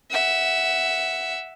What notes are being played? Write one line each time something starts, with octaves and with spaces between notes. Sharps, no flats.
E5 F#5